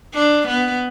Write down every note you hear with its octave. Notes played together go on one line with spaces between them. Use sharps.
D4
B3